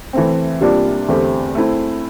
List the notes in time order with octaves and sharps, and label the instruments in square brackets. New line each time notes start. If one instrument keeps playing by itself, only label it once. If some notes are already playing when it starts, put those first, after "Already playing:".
[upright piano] E3 A3 C4
C3 G3 A#3 D4 F4
E2 D3 A3 C4 G4
A3 C4 E4